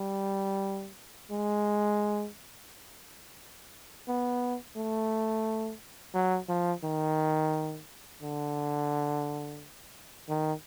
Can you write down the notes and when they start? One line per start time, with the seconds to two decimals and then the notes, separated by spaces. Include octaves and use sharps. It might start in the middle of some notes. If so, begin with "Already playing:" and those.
Already playing: G3
1.31 G#3
4.08 B3
4.76 A3
6.14 F#3
6.48 F3
6.84 D#3
8.22 D3
10.29 D#3